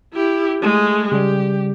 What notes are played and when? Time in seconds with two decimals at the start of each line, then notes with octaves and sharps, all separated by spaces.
0.13 E4 G4
0.61 G#3 A3
1.12 C#3 G3 G4